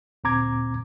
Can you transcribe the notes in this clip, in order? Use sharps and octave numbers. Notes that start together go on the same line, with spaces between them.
D2 A#2 C4 A#5 D6 G#6